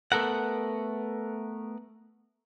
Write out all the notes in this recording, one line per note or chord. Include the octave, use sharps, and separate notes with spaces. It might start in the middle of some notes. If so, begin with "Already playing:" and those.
A3 B3 A4 A#4 F#5